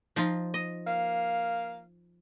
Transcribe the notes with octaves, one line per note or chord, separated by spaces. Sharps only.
F3 D#4 F4
D#5
A#3 F5